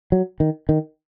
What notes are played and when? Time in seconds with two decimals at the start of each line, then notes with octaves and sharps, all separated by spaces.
0.12 F#3
0.40 D#3
0.69 D#3